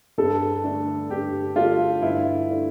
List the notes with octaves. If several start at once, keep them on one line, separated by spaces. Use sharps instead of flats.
G2 A4
D3 A3 D4
G2 G4
D3 A3 D4 F4
G2 E4
D3 A3 D4